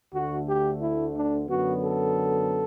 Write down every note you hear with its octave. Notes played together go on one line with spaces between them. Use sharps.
D2 D3 A3 F#4
G4
E4
D4
F#2 D3 F#3 B3 F#4
A4